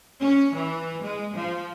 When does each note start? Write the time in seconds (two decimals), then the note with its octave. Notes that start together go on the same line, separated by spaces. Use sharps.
0.21 C#4
0.54 E3
1.01 G#3
1.35 F3